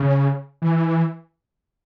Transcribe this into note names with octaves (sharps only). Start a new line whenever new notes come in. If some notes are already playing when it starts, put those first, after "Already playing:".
Already playing: C#3
E3